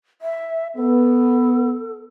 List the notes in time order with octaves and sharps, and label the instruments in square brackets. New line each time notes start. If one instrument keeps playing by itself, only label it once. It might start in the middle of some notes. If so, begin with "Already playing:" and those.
[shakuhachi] E5
[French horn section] B3 [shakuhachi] A4